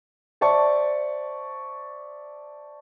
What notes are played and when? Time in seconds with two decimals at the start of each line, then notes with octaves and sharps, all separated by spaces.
0.41 C5 D5 E5 A5 C#6